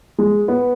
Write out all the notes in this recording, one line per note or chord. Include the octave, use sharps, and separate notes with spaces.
G#3
B3